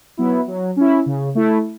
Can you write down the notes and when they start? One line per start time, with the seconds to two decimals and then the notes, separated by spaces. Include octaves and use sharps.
0.17 F#3 B3 E4
0.48 F#3
0.76 C#4 E4
1.06 C#3
1.35 A3 E4